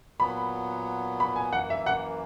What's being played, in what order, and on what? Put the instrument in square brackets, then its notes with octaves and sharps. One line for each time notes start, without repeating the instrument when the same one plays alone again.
[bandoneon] A#2 F#3 B3 [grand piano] B5
[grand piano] B5
G#5
[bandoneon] F#2 E3 A#3 [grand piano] F#5
[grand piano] E5
F#5